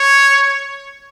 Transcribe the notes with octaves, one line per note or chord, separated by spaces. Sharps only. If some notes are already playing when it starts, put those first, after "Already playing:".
Already playing: C#5